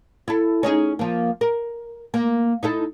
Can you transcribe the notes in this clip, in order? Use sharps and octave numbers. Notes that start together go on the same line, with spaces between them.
E4 A4
C#4 D#4 G#4
F3 A#3
A#4
A#3
D#4 E4 A4